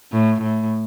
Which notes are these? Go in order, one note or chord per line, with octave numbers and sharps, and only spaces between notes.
A2
A2